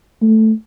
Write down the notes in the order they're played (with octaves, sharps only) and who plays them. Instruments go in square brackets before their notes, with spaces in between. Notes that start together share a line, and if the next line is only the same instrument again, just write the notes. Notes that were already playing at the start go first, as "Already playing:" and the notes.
[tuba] A3